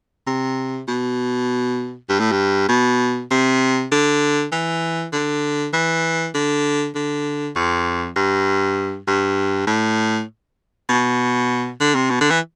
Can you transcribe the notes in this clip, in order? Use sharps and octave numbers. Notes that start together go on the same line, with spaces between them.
C3
B2
G2
A2
G2
B2
C3
D3
E3
D3
E3
D3
D3
F2
G2
G2
A2
B2
D3
C3
B2
D3
E3